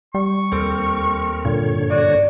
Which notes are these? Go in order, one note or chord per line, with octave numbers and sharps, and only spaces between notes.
G3 C#6
D#2 C4 A4 A#4
G2 A#2 D3 C#5
D4 F#4